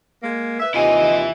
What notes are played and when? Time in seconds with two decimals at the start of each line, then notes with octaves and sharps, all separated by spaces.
0.22 G#3 A#3
0.60 B4 E5
0.74 D#2 C3 E4 F4 D#5 G#5